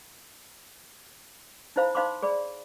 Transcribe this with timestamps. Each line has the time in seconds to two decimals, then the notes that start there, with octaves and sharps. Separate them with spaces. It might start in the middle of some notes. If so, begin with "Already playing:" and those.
1.76 D#4 E4 C5 F5 B5
1.95 D#4 C5 F5 B5 C6 D6
2.22 G#4 D5 B5